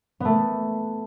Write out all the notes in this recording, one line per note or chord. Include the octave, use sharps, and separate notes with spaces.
A3 B3